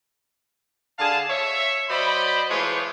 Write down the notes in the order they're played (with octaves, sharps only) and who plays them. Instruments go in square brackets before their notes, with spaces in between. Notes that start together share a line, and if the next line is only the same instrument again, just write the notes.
[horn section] D3 G#4 F5 A5
C#5 E5
F#3 C5 D5 D#5 B5
E3 G#3 A3 F4 C5 C#5